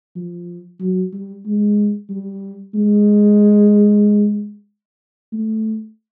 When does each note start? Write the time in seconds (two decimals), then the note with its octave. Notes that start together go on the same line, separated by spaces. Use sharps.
0.16 F3
0.80 F#3
1.12 G3
1.46 G#3
2.10 G3
2.75 G#3
5.33 A3